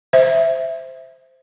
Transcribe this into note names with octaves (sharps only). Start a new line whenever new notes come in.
C5 E5